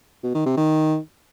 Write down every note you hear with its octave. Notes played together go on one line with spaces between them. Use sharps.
B2
D#3
C3
D#3